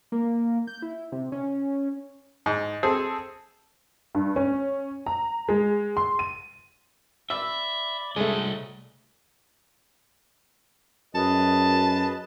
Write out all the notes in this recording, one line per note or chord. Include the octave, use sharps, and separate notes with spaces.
A#3
G6
E4
C3
C#4
G#2
C4 G#4 A4
G2
C#4
A#5
G#3
C6
D#7
D5 E5 B5 D6 E6
C2 G#3 A3 D#5
F#2 G#4 B4 D#5 A5